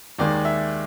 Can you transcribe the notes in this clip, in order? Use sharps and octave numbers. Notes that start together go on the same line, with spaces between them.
D#2 D#3 G#3 D5
E5